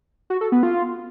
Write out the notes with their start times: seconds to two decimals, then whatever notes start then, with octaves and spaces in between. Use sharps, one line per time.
0.30 F#4
0.41 A4
0.52 B3
0.63 F4